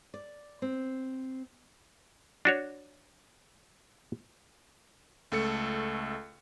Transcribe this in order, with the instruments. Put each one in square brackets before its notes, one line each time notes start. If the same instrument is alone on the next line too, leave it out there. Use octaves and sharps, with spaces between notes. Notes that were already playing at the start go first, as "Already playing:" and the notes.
[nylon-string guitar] D5
C4
[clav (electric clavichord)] D4 F#4 C#5
[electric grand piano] C#2 A3 A4 C#7